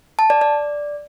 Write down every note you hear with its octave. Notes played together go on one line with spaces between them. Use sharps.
A5
D5
D5